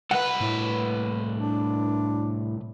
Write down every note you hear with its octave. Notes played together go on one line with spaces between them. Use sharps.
C2 B4 F#5
A2
D4